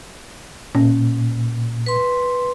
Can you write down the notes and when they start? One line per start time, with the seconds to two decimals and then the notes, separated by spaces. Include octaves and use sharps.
0.75 A#2 C#4
1.86 B4 C6